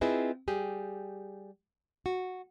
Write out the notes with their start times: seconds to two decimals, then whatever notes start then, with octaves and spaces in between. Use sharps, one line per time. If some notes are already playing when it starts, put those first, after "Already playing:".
0.01 C4 E4 F4 G#4 B4 D#5
0.48 G3 G4 G#4
2.06 F#4